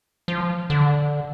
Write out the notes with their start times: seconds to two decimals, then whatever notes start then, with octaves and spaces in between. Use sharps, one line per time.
0.28 F3
0.70 D3